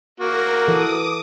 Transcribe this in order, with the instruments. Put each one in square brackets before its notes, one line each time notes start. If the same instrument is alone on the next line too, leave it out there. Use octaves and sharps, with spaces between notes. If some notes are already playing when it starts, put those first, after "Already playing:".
[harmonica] A#3 F#4 [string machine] A#4
[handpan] E3 A4 [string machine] D6 D#6